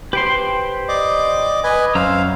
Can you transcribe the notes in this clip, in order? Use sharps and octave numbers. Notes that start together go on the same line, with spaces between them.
G4 B4 C5 G5 C6
D5 D#5 D6
B4 D#5 G#5
F#2 C5 C#5 F5 A#5 E6